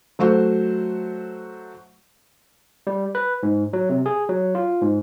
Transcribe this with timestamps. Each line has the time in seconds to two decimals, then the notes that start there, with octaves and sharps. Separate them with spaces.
0.19 F#3 A3 F#4 C5
2.87 G3
3.15 B4
3.43 G#2
3.73 F#3
3.89 C3
4.06 G#4
4.29 F#3
4.55 F4
4.81 G#2